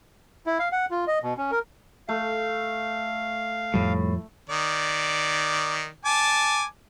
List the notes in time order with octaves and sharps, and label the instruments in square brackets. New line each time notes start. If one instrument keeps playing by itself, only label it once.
[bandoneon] E4
F5
F#5
F4
D#5
B2
C#4
A#4
[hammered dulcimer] A3 [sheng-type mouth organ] F5
[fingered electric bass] F2 F3 G3 [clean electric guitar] A2
[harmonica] D#3 D5
G#5 A5 D6